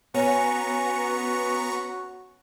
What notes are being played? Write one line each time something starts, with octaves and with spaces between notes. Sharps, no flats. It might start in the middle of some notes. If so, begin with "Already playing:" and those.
B3 C#4 F#4 A#5 C#6